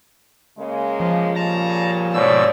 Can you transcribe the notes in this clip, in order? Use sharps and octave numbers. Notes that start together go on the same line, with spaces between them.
C#3 G#3 A#3
F3
A#2 C#3 G3 A5 A#5
G#2 B2 C#5 D5 E6